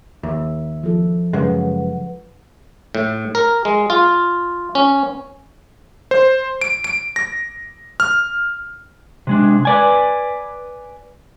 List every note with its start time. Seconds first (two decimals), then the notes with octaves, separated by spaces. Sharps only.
0.23 D#2 E5
0.83 F3 E4 A4
1.33 F#2 C#3 G#3 B4 F#5
2.95 A2
3.35 A#4
3.65 G#3
3.90 F4
4.75 C#4
6.11 C5
6.61 D7
6.84 D7
7.16 A#6
8.00 F6
9.27 C3 G#3 D4
9.65 B4 D5 G#5